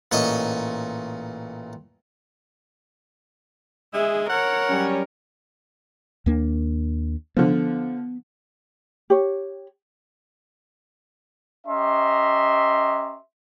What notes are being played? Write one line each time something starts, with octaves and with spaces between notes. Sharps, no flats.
A1 A#2 C#5 D#5 C#6
G#3 G#4 E5
A#4 C#5 F#5
F#3 G3 C#4
D#2 A#3 D4
D3 F3 B3
G4 C#5
C#4 G4 D#5 E5 A#5 C6